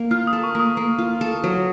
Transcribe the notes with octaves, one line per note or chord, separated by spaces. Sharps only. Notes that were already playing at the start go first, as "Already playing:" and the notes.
Already playing: A#3
F4 F6
D#6
A4
C#6
A#3 D#6
A#3
F4
A4
F#3